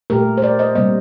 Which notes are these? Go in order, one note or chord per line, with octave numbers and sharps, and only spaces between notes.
A#2 A3 G4 A#4
C5
A#4 D5
C5 D#5
C3 G3 A#3 C5 D#5